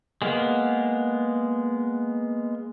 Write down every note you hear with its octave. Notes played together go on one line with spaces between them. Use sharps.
G#3 A#3 B3 F5